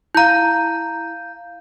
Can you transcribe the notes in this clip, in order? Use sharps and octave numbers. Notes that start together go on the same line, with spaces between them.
E4 F5 A#5 G6